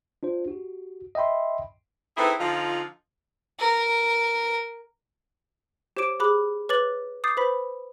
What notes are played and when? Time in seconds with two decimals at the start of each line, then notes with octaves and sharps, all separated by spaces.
0.23 D4 F4 C5
0.48 F#4 G4
1.15 D#5 E5 G5 B5 C6
2.17 C4 D#4 E4 G#4 A4 B4
2.39 D3 F3 D#4 F4
3.59 A#4
5.97 G4 C5 C#5 D6 D7 E7
6.20 G4 G#4 B5 D6 F#6
6.69 B4 C#5 D6 F#6 A6 F#7
7.24 D6 D#6 G6 A6 C7
7.37 B4 C5 B5 B6